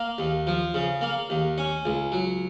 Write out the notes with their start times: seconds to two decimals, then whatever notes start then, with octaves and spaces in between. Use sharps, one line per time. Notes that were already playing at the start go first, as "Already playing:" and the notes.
Already playing: A#3
0.18 D#2
0.47 F3
0.74 C#3
1.01 A#3
1.30 D#2
1.58 C#4
1.85 C#2
2.12 F#3